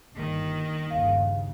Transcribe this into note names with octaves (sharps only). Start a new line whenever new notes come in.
G1 D#2 D#3
G1 D#2 C#3 F5